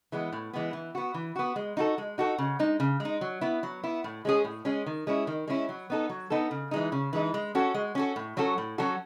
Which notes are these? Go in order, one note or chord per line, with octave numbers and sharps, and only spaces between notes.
E3 G#3 B3
A2
E3 G#3 B3
E3
B3 F#4
E3
B3 F#4
G#3
D#4 F#4 A4
G#3
D#4 F#4 A4
C#3
G#3 D#4
C#3
G#3
D#4
F#3
B3 E4
F#3
B3 E4
A2
G#3 C#4 G#4
A2
G#3 C#4 G#4
D#3
G#3 C#4 E4
D#3
G#3 C#4 E4
F#3
B3 D#4 A4
F#3
B3 D#4 A4
C#3
E3 G#3 D#4
C#3
E3 G#3 D#4
G#3
C#4 F#4 A4
G#3
C#4 F#4 A4
A2
F#3 C#4 F#4 A4
A2
F#3 C#4 F#4 A4